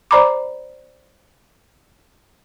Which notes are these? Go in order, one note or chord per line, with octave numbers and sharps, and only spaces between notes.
C5 D5 A#5 B5 D6